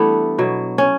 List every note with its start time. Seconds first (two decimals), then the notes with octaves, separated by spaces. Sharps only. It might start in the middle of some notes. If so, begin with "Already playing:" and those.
Already playing: E3 G3 A3 B3 D4 E4
0.38 B2 F#3
0.78 C#4